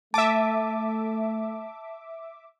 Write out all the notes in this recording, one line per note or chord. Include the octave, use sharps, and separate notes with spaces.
A3 E5 A5 D6